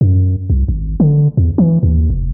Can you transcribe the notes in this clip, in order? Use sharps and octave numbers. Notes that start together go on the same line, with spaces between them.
F#2
C2
G#1
D3
E2
E3
D#2
F1